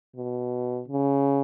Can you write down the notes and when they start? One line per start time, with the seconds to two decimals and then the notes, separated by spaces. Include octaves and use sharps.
0.16 B2
0.88 C#3